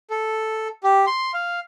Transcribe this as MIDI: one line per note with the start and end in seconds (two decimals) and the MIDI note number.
0.10 0.68 69
0.83 1.05 67
1.07 1.32 84
1.34 1.60 77